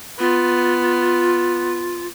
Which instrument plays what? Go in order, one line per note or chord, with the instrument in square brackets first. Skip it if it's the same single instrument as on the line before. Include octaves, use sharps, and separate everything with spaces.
[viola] B3 [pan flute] F4